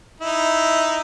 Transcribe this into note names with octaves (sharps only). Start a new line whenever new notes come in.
D#4 E4